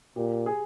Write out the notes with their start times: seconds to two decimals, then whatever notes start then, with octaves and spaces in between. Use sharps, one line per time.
0.16 A#2 G4
0.46 G#4